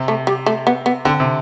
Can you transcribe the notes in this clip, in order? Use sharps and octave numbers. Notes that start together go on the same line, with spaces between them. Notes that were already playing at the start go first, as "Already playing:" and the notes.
Already playing: C3
A3
G3
A3
B3
B3
D3 C4
C3